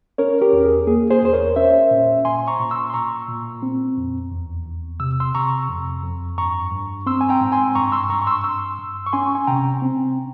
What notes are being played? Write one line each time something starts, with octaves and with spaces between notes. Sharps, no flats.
C#4 A#4 C#5
G4 A#4
E2
G#4
A#3 G#4
G#4 C5
E2 C5
A#4 C#5
C#4 C5 E5
A#2
A#2 G#5 C6
A#5 C#6
A#2
C6 E6
C6
A#2 A#5 C#6
A#2
C4
F2
E2
E2
C3 E6
C6 E6
C3 A#5 C#6
F2
F2
G2 A#5 C#6
G2
C4 C6 E6
G#5
G5 A#5
G#2
G#5 C6
G2 A#5 C#6
C6 E6
G2 A#5 C#6
C#6
C6 E6
G2 C6 E6
G2
C#6
C#4 G#5 C6
G#5
C3 G5 A#5
C4